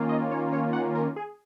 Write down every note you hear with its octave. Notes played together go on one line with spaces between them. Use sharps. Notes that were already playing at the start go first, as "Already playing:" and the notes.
Already playing: D#3 A#3 C#4 F4
D#5
C#5
C#5
F#5
A#4
G#4